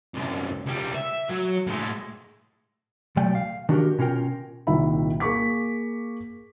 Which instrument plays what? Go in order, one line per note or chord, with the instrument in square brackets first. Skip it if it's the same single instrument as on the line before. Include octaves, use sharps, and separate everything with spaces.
[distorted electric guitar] C2 F#2
C#2 G3
E5
F#3
A2 G#3
[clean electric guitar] C#2 B2 F#3 A3 D5 G5
F5
D#3 D4 F#4 G4 A#4
B2 C#4 F4 A#4 G5
[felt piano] C2 A#2 D#3 E5 B5
A#3 G#4 C#6 D6 B6